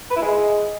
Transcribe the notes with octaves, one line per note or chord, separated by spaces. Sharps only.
B4
E4
G#3